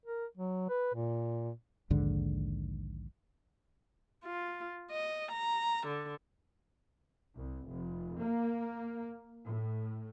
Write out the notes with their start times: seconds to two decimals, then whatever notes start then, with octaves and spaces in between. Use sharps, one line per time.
0.06 A#4
0.38 F#3
0.70 B4
0.94 A#2
1.90 A#1 D#2 G#2 D3
4.25 F4
4.91 D#5
5.32 A#5
5.87 D3
7.35 C2
7.68 F1
8.19 A#3
9.46 A2